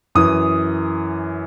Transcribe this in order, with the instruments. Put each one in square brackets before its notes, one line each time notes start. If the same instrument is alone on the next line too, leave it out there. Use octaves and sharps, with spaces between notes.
[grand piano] F#2 E3 D#6